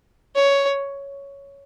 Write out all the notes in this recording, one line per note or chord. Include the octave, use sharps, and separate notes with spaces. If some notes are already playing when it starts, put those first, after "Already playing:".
C#5